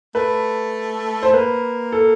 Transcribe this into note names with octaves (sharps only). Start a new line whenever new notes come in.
A3 B4
C5
A#3 B4
A4